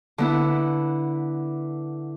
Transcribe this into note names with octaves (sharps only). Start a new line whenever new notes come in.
D3 B3 E4